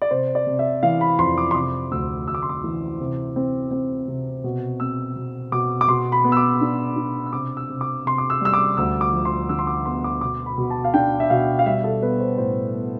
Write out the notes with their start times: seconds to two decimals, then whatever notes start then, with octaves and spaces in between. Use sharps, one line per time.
0.02 D5
0.11 C3 C5
0.35 D5
0.47 C3
0.59 E5
0.83 E3 F5
1.01 B5
1.19 F2 C6
1.38 D6
1.51 C6
1.55 C3 D6
1.91 D2 E6
2.28 D2 E6
2.35 D6
2.43 C6
2.49 D6
2.64 E3
3.00 C3
3.36 C4
3.71 C4
4.08 C3
4.44 B2
4.80 C4 E6
5.16 B2
5.52 B2 D6
5.81 D6
5.88 B2 C6
6.12 B5
6.24 B3
6.32 E6
6.37 D6
6.61 D4
6.96 D4
7.26 E6
7.33 C3 D6
7.57 E6
7.69 C3
7.81 D6
8.05 C3 C6
8.18 D6
8.30 E6
8.41 G3 E6
8.54 D6
8.77 D2 E6
9.01 D6
9.13 F3
9.25 C6
9.49 D3 E6
9.59 C6
9.67 D6
9.86 B3 C6
10.04 D6
10.21 B2 D6
10.46 B5
10.58 B2
10.71 A5
10.84 F5
10.94 D4 G5
11.20 E5
11.30 B2 F5
11.59 F5
11.66 G3 E5
11.84 A4
12.02 B3 B4
12.20 C5
12.38 A2 C5
12.75 B3